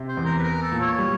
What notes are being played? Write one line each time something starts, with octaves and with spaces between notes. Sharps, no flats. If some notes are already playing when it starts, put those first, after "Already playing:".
Already playing: C3
C5
E2
A#4
B4
B3 A#4
A4
A#2
C#5
G3